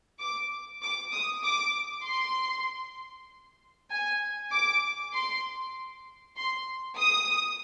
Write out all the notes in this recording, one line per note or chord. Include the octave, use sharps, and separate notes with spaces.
D6
D6
D#6
D6
C6
G#5
D6
C6
C6
D#6